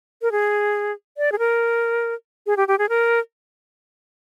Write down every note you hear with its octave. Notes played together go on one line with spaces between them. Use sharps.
A#4
G#4
D5
G#4
A#4
G#4
G4
G4
G#4
A#4